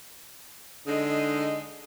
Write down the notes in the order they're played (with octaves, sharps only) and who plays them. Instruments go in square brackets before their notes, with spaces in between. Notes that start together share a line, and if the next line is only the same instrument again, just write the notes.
[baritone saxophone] D3 [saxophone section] G#3 D#4